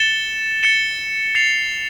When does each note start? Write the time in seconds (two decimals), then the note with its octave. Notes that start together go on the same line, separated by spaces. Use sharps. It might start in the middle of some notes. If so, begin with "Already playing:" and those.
Already playing: A6 C#7 E7 G7
0.63 A6 C#7 E7 G7
1.35 A6 C7 F7